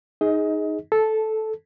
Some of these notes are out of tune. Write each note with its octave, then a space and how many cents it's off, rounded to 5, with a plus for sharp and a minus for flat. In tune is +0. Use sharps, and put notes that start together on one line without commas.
D#4 +0 G#4 +0 D#5 +25
A4 -10 A5 +0